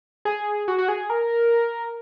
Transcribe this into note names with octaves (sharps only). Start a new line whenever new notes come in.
G#4
F#4
F#4
G#4
A#4